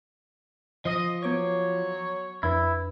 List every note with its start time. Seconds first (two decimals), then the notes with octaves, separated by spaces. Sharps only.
0.85 F3 D#5
1.23 F#3 B3 C#5 D6 G#6
2.43 F2 D4 E4 B4